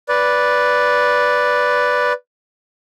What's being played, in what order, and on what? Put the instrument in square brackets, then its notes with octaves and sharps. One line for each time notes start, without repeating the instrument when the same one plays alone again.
[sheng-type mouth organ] B4 D5